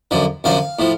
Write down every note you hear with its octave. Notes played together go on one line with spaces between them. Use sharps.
F#2 D3 F3
F#2 D3 F3 F5
A2 F3